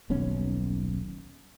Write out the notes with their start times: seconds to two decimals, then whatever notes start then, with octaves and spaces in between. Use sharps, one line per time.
0.10 D#1 B1 C#4